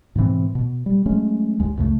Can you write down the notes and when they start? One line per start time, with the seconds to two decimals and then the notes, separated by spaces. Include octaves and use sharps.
0.15 G#2 B2 E3 C4
0.55 B2
0.86 G3
1.06 F#3 G#3 A3 C#4
1.60 D#2 G#3
1.76 C#2 F#2 C#3 A3